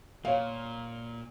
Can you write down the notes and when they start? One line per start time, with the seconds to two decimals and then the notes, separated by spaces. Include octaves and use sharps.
0.25 A#2 C#5 F5